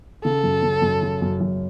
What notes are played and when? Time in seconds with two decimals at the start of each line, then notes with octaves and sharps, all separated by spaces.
0.24 C#3 A4
0.43 F#2
0.62 C#3
0.82 F#2
1.02 C#3
1.22 F#2
1.40 F#2